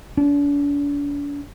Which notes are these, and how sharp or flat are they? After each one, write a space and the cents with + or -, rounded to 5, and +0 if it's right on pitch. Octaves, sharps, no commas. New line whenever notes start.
D4 -40